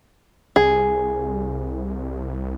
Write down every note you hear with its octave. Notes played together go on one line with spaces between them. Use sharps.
C2 G#4